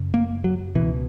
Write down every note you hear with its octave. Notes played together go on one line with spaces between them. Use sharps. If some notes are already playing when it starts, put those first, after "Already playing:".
Already playing: F#2 C#3
A#3
F#3
C#2 B2 E3